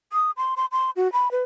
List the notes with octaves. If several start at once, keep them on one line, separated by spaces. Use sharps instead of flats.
D#6
C6
C6
C6
F#4
B5
B4